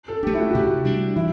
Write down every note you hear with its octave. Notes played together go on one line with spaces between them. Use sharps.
A4
A3 D4 G4
E4
F#4
F#4
C3 G4
G3 D4
E3 E4